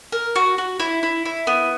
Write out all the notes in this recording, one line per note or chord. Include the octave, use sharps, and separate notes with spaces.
A#4
F#4
F#4
E4
E4
E4
B3